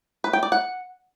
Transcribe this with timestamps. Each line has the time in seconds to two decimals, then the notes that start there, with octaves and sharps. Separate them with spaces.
0.24 B4
0.33 G5
0.43 D5
0.52 F#5